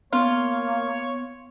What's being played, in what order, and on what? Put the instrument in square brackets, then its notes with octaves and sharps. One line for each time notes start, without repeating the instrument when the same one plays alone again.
[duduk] A#3 [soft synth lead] B3 [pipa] F4 [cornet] C#5